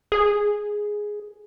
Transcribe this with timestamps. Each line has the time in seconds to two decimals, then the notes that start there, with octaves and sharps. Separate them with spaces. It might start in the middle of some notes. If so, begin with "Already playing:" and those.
0.12 G#4